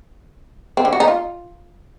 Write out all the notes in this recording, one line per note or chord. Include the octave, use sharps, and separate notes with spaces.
C4
D3
F#4
D#4
F4